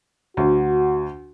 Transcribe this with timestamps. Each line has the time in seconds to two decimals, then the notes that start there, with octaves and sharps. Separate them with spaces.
0.37 D2 F#4